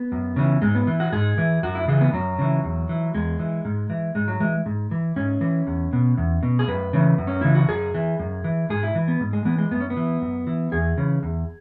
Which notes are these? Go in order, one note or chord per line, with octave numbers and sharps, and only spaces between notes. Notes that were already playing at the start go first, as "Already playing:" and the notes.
Already playing: B3
F#2
C#3 E3
G#2 G#3
B3
E3
F#4
G#2 G#4
E3
F#2 F#4
E4
C#3 E3 G#4
B3
F#2 F#3
C#3 E3
E2
E3
E2 G#3
E3
G#2
E3
G#2 G#3
F#3
E3 G#3
G#2
E3
G#2 C#4
E3
E2
B2
E2
B2
G#4
F#2 B4
C#3 E3
F#2
C#4
C#3 E3 E4
F#4
F#2 G#4
E3
F#2
E3
G#2 G#4
E4
E3
B3
G#2
G#3
E3 B3
G#3
F#2 B3
C#4
B3
E3
F#2
E3
E2 G#4
C#3 E3
E2